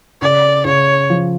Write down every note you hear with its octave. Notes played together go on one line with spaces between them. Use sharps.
C#3 D5
C#3 C#5
F3